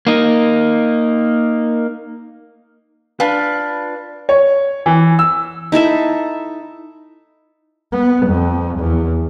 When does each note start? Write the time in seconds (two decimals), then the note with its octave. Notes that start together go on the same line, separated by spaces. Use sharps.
0.07 A#3 D#4
3.20 D4 F4 B4
4.29 C#5
4.86 E3
5.19 E6
5.72 D#4 E4 A4 E5
7.92 B3
8.26 F2
8.79 E2